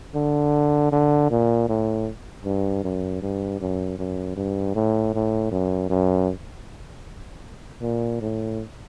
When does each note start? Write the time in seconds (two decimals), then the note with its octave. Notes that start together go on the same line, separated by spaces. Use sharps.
0.15 D3
0.92 D3
1.31 A#2
1.68 A2
2.45 G2
2.84 F#2
3.22 G2
3.61 F#2
3.99 F#2
4.36 G2
4.75 A2
5.14 A2
5.52 F#2
5.90 F#2
7.82 A#2
8.21 A2